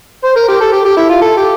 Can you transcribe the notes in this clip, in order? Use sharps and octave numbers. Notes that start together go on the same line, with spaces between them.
C5
A#4
G4
A4
G4
G4
E4
F4
A4
G4